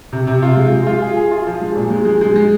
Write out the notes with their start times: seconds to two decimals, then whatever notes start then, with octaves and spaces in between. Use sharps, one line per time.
0.13 C3
0.27 C3
0.42 F4
0.57 G#3
0.72 G#3
0.87 F4
1.02 G#4
1.17 G#4
1.31 F4
1.47 F3
1.62 G#3
1.76 A#2
1.90 G#3
2.05 G#3
2.21 G#3
2.36 G#3